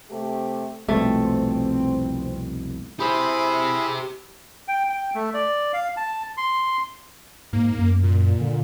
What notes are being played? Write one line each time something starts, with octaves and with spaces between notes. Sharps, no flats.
C3 A3 G4
C2 F2 B2 A3 C4
E4 G4 G#4 C5 B5
G5
G5
A3
D5
F5
A5
C6
G#2 A#3
F#2
A#2
D3